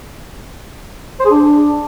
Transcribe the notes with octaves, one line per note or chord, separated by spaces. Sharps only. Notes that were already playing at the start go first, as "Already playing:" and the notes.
C5
G#4
D4